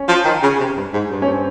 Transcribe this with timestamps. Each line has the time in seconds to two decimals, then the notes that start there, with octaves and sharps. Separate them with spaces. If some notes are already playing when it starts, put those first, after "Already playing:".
Already playing: C#4
0.09 F3
0.25 D#3
0.43 C#3
0.59 C3
0.77 G2
0.93 G#2
1.10 G2
1.22 C#4
1.27 C4